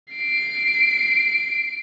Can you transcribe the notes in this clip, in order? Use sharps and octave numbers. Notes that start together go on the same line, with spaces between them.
C7 D7